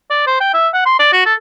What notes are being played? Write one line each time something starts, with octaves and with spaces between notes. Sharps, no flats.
D5
C5
G5
E5
F#5
C6
D5
F#4
A4